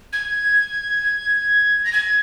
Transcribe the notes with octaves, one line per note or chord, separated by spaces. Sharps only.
G#6
A#6
G#6